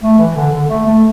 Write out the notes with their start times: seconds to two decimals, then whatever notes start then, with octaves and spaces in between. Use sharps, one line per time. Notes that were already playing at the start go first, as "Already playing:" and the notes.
0.02 A3
0.19 E3
0.36 D3
0.53 D3
0.69 A3
0.86 A3